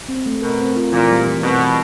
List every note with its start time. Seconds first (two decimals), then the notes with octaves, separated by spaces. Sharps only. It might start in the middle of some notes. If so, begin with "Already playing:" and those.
0.09 C4
0.26 A3
0.42 B2 A#4
0.59 C4
0.76 F4
0.92 A#2 E3
1.10 G3
1.26 E3
1.43 B2 C4
1.60 E3